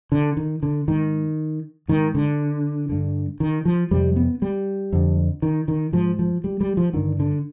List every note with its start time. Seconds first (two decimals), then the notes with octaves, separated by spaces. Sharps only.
0.12 D3
0.37 D#3
0.63 D3
0.88 G#2 D#3
1.88 G#2 D#3
2.15 D3
2.89 G2 D3
3.40 D#3
3.65 F3
3.91 F2 C3 G3
4.16 B3
4.42 G3
4.93 F2 D3
5.42 D#3
5.68 D#3
5.93 G#2 F3
6.19 F3
6.44 G3
6.61 G3
6.77 F3
6.93 G2 D3 D#3
7.20 D3